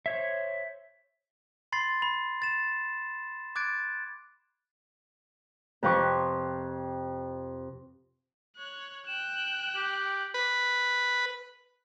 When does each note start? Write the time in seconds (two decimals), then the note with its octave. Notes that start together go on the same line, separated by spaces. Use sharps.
0.06 C5 C#5 E5
1.72 B5 C6 A6 C7
2.02 B5
2.42 A6 E7
3.56 D6 F#6 G#6 A6 D7
5.83 F2 C3 F3 B4 C#6 D6
8.57 C#5 F#6
9.07 G5 F#6 E7
9.76 G4
10.34 B4